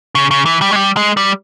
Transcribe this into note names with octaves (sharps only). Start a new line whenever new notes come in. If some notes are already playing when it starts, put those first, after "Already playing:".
C#3
C#3
E3
G3
G#3
G3
G#3
G3